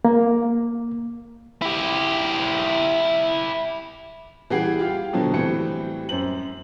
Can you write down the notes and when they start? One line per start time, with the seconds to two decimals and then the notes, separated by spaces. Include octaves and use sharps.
0.05 A#3
1.62 E4 G4
4.50 E3 G3 G#4 F#5 G5 C7
4.79 F4 G4 F5
5.13 B2 D3 F3 F#3
5.33 A2 E3 G3 C4 C#7
6.09 F#2 C5 F#7